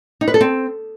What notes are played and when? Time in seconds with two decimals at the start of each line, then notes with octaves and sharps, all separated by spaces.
0.21 D#4
0.28 B4
0.34 A4
0.41 C4